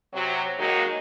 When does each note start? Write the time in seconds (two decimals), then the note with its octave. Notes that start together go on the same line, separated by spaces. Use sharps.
0.13 C3 F#3
0.59 D#3 F#3 G#3 A#3 D#4 F#4